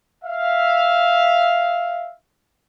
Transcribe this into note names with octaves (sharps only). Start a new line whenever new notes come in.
E5 F5